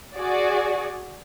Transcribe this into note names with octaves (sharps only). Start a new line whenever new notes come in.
F#4 G#4 D5